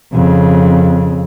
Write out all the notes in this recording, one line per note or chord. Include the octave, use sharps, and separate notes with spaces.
F2 C#3